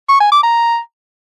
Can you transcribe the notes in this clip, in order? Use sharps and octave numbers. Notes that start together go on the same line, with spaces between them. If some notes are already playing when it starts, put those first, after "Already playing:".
C#6
G#5
D6
A#5